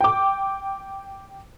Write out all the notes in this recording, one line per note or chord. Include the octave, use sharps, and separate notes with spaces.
G5 D6